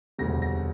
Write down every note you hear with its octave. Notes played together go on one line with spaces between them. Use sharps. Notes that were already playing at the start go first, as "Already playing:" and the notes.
E1 D2 C3 G3 A#6
A#6